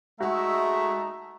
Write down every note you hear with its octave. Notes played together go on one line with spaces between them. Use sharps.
G#3 A3 D#4 F#4 A4 E5 A#5